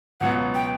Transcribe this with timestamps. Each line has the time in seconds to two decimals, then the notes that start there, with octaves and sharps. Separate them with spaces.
0.21 C#2 B2 F#3 B3 F#5
0.55 G5